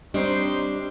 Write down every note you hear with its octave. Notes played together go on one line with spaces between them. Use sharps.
G3 C4 D4 D#4 C5 C#5 D#5 C6